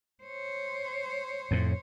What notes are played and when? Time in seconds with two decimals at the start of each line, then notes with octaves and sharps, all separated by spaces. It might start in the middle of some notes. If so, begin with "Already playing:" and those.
0.24 C5 C#5
1.51 F2 A2